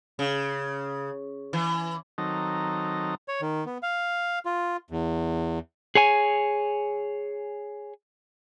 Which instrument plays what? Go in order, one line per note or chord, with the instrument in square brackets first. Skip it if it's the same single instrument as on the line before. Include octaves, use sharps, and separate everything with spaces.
[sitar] C#3
E3
[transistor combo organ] D#3 F#3 C4 D#4 A4 A#5
[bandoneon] C#5
D#3
B3
F5
F4
E2
[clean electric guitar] G#4 C#5 G#5